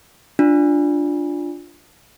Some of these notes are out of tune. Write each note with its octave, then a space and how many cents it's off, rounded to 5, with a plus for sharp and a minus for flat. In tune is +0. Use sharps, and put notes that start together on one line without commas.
D4 +0 F4 +0